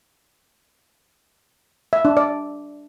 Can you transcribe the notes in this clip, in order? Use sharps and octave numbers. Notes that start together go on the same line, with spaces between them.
E5
D4
D5